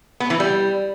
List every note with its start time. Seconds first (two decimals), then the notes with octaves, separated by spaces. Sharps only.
0.20 B3
0.30 E3
0.40 G3